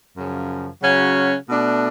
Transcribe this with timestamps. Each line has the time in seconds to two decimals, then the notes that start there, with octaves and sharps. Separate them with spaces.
0.16 F#2 C#3 F3
0.82 C#3 F#3 C#4 F#4
1.49 B2 A3 D4